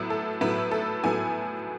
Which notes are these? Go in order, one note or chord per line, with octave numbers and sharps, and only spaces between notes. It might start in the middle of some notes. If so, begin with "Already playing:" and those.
Already playing: A2 F#3 B3 E4
A4
A2 F#3 B3 E4 B4
A4
A2 F#3 B3 E4 G#5